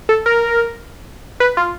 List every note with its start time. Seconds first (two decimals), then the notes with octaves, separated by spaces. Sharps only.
0.09 A4
0.26 A#4
1.40 B4
1.57 F4